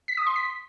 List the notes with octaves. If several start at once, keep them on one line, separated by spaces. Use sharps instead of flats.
B6
D#6
C6
B6